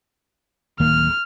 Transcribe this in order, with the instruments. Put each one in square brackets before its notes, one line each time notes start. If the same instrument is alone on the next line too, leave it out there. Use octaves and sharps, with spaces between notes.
[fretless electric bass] D1 D#3 A#3 [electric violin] F6